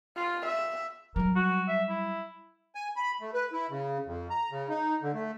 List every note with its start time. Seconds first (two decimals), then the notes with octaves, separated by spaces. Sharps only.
0.16 F4
0.45 E5
1.16 F#3 G3 A#4
1.36 F#4
1.68 E5
1.90 E4
2.75 G#5
2.96 B5
3.21 A3
3.34 B4
3.52 E4
3.70 C#3
4.06 F2
4.30 A#5
4.51 C#3
4.69 D#4
5.02 D3
5.14 A3